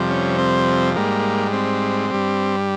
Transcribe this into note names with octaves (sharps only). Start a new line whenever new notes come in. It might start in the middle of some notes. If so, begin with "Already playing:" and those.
Already playing: F2 C3 G3
C#4
C4
G#2 G3 A#3
C4
G2 G3